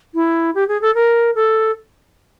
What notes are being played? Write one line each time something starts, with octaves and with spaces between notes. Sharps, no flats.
E4
G4
G#4
A4
A#4
A4